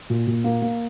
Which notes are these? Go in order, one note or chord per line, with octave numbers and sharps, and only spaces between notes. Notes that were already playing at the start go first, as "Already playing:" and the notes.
A#2
A#2
A#3
A#3